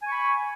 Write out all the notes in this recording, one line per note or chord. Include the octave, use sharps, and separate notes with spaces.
G#5 B5 C#6